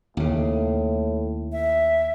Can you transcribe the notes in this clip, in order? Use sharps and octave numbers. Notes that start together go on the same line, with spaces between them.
D#2 A2 C#3
E5